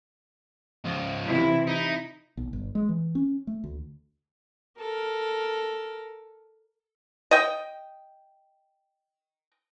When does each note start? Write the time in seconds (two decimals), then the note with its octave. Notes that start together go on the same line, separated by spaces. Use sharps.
0.85 C#2 F3
1.25 C3 E3 E4
1.67 D#4 E4
2.37 B1
2.53 G1
2.75 G#3
2.89 E3
3.15 C#4
3.47 A3
3.64 D2
4.80 A4 A#4
7.31 D#5 G5